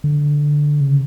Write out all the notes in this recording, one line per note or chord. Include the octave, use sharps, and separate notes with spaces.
D3
C#3